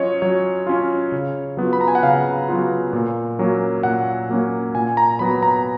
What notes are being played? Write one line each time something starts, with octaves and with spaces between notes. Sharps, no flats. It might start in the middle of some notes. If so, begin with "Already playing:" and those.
Already playing: F#3 C#4 F4 C#5 D#5
F#3 C#5
C#4 F4
C#3
F#3 B3 F4
B5
A#5
G#5
F#5
C#3 F5
F#3 B3 F4
A#2
F#3 A#3 C#4
A#2 F#5
F#3 A#3 C#4
A#2 G#5
A#5
F#3 B3 B5
A#5